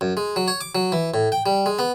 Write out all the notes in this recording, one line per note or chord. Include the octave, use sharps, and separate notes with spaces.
F#2
G#3
F#3
C#5
D6
F#3
E3
A2
G5
G3
G#3
B3